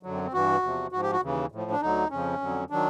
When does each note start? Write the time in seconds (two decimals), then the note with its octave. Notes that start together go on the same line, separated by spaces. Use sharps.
0.03 F#2 D3 F#3
0.13 C4
0.24 C4
0.33 G2 E3 F#4
0.63 E2 C3 F3
0.92 G#2 F3 F#4
1.02 G4
1.12 F#4
1.23 D#2 C#3 E3
1.52 A2 F3
1.71 D4
1.81 D2 D3 F#3 D#4
2.11 F2 C#3 F3 C#4
2.41 F2 D3 F#3
2.70 D#3 F#3 D4